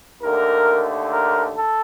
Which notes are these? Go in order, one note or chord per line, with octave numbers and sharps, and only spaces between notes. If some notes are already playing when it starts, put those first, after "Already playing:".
D#2 D3 A3 A#4
A#4
A4